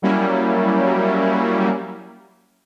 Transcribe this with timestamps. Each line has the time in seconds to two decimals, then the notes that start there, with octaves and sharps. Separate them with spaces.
0.02 F#3 G3 A#3 C#4 E4